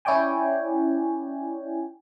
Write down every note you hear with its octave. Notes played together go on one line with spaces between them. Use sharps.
C#4 E4 C#5 D5 G5 G#5